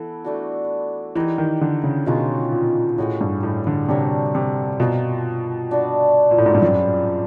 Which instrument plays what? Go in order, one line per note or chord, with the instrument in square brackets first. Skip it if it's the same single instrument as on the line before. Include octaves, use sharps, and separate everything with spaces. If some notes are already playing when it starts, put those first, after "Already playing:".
Already playing: [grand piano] E3 [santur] B3 E4 A4
[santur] A3 D4 F#4
[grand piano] E3 [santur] D#4 G4 A#4 D#5
[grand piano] D#3
D3
C#3
[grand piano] B2 [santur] G#3 C#4 F4 A#4
[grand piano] A#2
[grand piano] A2 [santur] G#3 C#4 F#4
[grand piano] G2
A2
D3
[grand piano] C3 [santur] D4 F#4 A#4 C#5
[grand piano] C3
[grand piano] B2 [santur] C4 F4 A#4
[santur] D4 F#4 B4 D5
[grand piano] A#2
A2
G#2
G2
[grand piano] F#2 [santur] C4 F4 G#4 B4